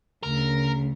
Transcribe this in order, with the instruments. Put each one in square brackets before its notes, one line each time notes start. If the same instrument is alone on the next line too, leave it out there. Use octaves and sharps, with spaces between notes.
[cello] D2 [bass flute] C#3 [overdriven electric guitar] A#4